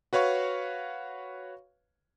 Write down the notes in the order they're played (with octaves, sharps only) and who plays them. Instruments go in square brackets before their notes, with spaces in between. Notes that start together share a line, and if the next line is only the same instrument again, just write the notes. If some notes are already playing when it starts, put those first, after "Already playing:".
[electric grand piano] F#4 B4 C#5 F5 C#6